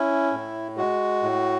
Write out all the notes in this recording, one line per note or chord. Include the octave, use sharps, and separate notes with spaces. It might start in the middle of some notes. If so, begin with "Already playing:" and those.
Already playing: C#4 E4
A2
G#3 F#4
A2